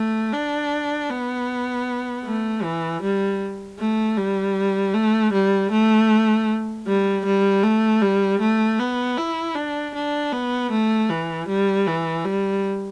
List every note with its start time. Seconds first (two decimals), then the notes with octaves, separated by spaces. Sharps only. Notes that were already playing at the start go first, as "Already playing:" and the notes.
Already playing: A3
0.33 D4
1.10 B3
2.25 A3
2.63 E3
3.02 G3
3.79 A3
4.17 G3
4.94 A3
5.33 G3
5.71 A3
6.86 G3
7.25 G3
7.63 A3
8.02 G3
8.40 A3
8.79 B3
9.18 E4
9.55 D4
9.94 D4
10.33 B3
10.71 A3
11.10 E3
11.48 G3
11.87 E3
12.25 G3